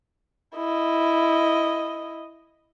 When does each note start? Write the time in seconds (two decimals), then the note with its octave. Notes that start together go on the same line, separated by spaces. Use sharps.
0.56 E4 D#5